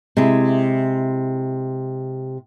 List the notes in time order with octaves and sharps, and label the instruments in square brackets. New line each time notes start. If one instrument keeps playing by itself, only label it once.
[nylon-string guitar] C3 G#3 E4 G#4